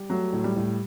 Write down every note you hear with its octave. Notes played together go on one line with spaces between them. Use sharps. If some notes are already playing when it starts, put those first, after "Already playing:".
Already playing: G3
F#3 A3
A2
G3
A2